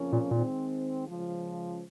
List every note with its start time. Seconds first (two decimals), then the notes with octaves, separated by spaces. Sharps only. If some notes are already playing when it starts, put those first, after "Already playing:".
Already playing: F2 C#3 F3 A#3 C#4
0.12 A#2
0.31 A#2 D#3 G#3 C4
1.06 C#2 C#3 F3